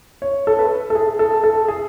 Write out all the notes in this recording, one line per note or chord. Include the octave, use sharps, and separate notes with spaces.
C#5
A4
B4
A4
G#4
A4
A4
G#4